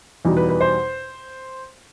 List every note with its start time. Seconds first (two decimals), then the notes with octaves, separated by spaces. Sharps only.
0.25 E2 B2 G3 D#4
0.37 B4
0.49 B4
0.61 C5